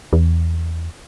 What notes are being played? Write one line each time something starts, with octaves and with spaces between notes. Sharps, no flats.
E2